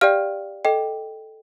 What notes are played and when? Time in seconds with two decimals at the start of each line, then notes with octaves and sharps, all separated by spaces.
0.01 G4 D5 F5 G5 F6
0.65 A4 D#5 G5